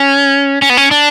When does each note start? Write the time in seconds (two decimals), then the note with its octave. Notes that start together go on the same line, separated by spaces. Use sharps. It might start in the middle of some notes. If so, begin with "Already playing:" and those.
Already playing: C#4
0.62 C#4
0.70 B3
0.77 C#4
0.91 D4